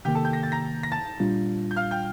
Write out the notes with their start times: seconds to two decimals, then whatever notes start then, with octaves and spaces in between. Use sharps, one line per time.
0.05 C3 D#3 A#3 G4 G5
0.15 A4 A5
0.25 G5 G6
0.33 A#6
0.43 A6
0.52 A#5 A#6
0.83 A#6
0.92 A5 A6
1.20 A#2 G3 D4 F4
1.71 G6
1.76 F5 F6
1.91 G5 G6